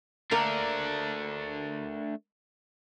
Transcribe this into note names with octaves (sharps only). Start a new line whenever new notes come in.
A3 A#3 D4 A#4